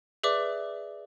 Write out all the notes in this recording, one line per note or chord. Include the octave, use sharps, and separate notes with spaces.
G#4 B4 D5 E5 D6